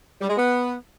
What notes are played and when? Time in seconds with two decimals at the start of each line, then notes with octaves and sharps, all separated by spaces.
0.21 G3
0.29 G#3
0.37 B3